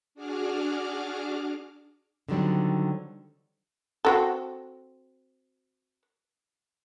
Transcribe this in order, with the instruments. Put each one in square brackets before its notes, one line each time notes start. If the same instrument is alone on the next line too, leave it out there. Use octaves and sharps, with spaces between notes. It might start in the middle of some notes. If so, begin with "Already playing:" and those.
[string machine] D4 F#4 G#4 D6 F6
[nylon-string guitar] D3 D#3 F#3 G3 C4
[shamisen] C4 F#4 A4